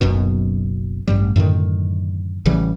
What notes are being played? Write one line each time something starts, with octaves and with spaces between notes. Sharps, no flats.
F#1 B1 F#2 B2
A1 G2 G3
F#2 A2 D3 D#3
A1 C#3 E3 G3